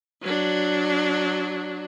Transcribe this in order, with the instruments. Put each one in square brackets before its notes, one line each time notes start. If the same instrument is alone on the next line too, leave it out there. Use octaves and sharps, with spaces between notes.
[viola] F#3 D4